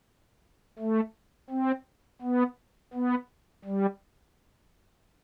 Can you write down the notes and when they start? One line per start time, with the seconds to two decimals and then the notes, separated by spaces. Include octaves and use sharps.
0.79 A3
1.50 C4
2.22 B3
2.94 B3
3.65 G3